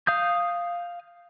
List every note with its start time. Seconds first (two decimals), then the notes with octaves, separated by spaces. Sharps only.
0.07 F5 D#6 G6